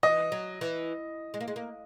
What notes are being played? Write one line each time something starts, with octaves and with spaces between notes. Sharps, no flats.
E3 D#5
F#3
E3
G#3
A#3
G#3
A#3